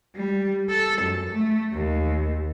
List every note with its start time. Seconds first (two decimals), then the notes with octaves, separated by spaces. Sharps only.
0.15 G3
0.69 A4
1.02 F#2
1.32 A3
1.73 D#2